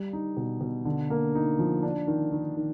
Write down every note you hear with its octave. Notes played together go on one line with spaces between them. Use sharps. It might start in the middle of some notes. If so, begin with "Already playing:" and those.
Already playing: G3
D#4
B2
B2
D3
A#3
D#4
F3
D4
D#3
D#3
D#3